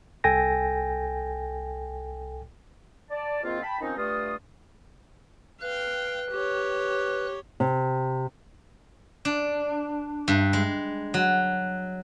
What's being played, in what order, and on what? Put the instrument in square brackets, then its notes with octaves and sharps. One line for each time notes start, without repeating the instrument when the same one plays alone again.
[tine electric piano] C2 A4 G5 G#5 A#6
[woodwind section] D5 A5
G#2 D#3 A#3 C4 F4
G5 A5 B5
D#3 F3 C4 C#4 D#4
G2 A3 F4 D#6
[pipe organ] B4 F#6 [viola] F5 G5
[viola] G4 C#5
[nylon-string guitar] C3
[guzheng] D4
G2
G#3
F#3